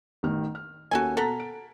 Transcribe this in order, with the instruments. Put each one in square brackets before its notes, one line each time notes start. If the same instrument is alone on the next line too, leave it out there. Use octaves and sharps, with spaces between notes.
[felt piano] A1 D#3 F6
F6
[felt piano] D#2 A#3 C#4 [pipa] F#4 A4 G#5
[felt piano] B2 A6 B6 [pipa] A4 F#5 A#5
[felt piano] D7